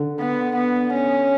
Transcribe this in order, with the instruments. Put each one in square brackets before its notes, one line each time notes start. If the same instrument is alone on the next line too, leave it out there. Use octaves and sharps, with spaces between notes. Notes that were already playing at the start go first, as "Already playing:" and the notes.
Already playing: [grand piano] D3
[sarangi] B3
B3
C#4